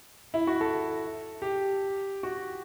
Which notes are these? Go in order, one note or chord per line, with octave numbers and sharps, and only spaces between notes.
E4
F#4
A4
G4
F#4